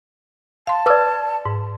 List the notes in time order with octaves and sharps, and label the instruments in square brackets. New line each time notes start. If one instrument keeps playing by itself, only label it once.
[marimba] F5 C6 [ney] A5
[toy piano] B4 D5 [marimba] D6 E6
[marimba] G#2